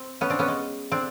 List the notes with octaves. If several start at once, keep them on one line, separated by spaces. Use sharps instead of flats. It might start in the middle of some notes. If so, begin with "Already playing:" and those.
Already playing: C4
B3 C#4
C4 D4
B3 C#4
G#3
C4 D4